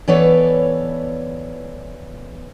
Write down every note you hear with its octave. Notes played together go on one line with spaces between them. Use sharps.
E3 B3 A4 B4 C#5 D5